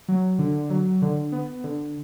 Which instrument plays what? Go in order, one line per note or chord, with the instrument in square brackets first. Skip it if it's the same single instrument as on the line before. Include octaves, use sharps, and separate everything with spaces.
[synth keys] F#3
D3
F#3
D3
B3
D3